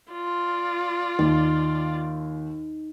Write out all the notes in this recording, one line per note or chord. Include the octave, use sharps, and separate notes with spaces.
F4 D5
D#2 D#4